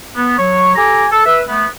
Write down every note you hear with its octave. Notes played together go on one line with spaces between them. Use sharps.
B3
F#3 C#5
G4 A4 G#5 A#5 D6
A4
B4 E5
A3 B3